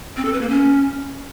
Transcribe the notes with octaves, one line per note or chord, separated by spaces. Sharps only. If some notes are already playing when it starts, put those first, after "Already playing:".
C4
A4
B4
A#3
C#4